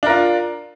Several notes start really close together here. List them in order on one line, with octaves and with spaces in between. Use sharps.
D4 A#4 F4